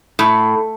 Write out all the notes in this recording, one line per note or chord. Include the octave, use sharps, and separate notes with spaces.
A2